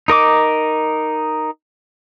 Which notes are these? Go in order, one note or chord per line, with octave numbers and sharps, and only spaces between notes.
D#4 A#4 D#5 D6